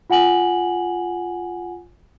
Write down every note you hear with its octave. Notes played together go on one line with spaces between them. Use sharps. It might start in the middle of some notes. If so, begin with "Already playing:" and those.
F4 F#5 G#5 F#7